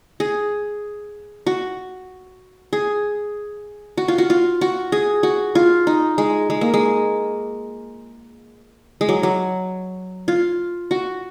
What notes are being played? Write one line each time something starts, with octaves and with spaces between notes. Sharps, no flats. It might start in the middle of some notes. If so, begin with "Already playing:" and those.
G#4
F#4
G#4
F#4
F4
F#4
F4
F#4
G#4
F#4
F4
D#4
G#3
G#3
A#3
G#3
G#3
F#3
F#3
F4
F#4